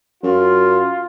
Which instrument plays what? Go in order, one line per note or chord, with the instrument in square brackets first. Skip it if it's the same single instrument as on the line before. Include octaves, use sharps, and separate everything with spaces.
[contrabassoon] F#2 [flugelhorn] F4